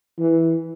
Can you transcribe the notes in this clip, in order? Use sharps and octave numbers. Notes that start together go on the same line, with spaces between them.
E3